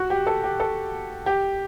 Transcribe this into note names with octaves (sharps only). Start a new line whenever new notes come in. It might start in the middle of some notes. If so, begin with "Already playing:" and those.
Already playing: F#4
G4
A4
G4
A4
G4